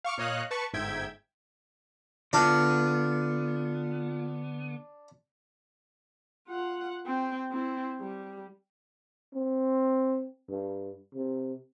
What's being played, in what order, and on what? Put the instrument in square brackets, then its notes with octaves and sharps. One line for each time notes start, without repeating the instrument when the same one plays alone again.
[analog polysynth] F5 C#6 D6 F6
A#2 C#5 D#5 F5 F#6
B4 A5 C#6
G1 G#2 E5 G5 G#6
[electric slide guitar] D3 B3 [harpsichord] D4 [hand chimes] F4 F6 F#6
[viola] F4 F#5
C4 G5
C4 E4
G3
[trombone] C4
G2
C3